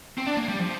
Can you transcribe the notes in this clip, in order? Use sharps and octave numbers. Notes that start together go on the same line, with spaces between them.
C4
D4
A#3
G3
F3